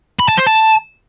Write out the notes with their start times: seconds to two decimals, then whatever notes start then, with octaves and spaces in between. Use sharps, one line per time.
0.19 B5
0.29 A5
0.38 C5
0.47 A5